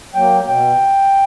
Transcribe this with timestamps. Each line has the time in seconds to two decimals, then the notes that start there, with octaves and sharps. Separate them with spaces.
0.14 F#3 A#3 G5
0.46 B2 G5